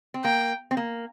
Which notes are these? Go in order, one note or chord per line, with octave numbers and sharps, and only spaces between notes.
C4
A#3 G5
C4
A#3